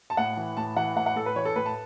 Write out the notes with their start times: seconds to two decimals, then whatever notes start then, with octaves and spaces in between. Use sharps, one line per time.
0.10 A5
0.17 A2 F#5
0.37 E3
0.57 A2 A5
0.76 E3 F#5
0.96 A2 F#5
1.06 F#5
1.16 A2 A4
1.26 B4
1.36 E3 C#5
1.45 A4
1.56 A2 B4
1.66 A5